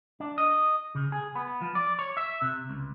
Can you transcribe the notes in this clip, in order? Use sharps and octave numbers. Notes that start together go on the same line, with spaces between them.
D4
D#5
C#3
G#4
B3
F3
D5
C#5
E5
C3
C#2